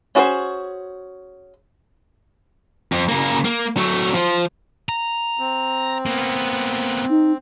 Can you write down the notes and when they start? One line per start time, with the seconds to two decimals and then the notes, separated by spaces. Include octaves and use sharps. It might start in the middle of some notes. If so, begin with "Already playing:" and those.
0.15 C#4 F#4 G#4 A4 C5
2.92 F2
3.09 C#3 A#3
3.45 A#3
3.77 F#3 A3
4.14 F3
4.89 A#5
5.39 C4
6.06 A#3 B3
7.10 D#4